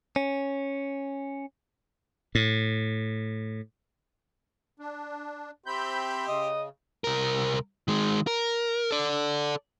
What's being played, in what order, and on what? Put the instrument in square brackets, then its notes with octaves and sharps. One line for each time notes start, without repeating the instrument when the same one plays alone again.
[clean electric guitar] C#4
[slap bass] A2
[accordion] D4
[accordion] C4 B5 G6 [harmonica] G4 E5 C6
[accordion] C#3 [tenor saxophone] D#5
[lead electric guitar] C2 A#4
D#3 G#3
A#4
A4 D5